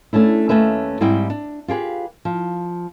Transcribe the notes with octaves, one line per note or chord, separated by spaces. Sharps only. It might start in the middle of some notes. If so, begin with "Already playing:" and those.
A3 C#4 D4 E4
D#2 E3 A3 C#4 B4 E5
G#2 G3 C4 E4 G4 G5
D4
F4 G4 G#4 B4
F3